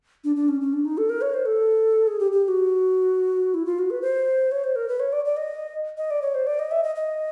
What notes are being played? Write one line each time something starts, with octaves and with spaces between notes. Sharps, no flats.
D4
D4
C#4
C#4
D4
D#4
A4
A#4
C#5
C5
A4
G#4
G4
G4
G4
F#4
E4
F4
F#4
B4
C5
C#5
C5
A#4
B4
C#5
D5
D5
D#5
D#5
D5
C#5
C5
D5
D#5
E5
D#5
D#5